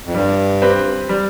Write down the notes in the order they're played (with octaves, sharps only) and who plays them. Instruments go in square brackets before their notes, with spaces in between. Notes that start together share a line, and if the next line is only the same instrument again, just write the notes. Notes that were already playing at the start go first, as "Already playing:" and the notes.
[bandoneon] F2
[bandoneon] G2 [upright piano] G3
[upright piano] C4 G4 B4
G3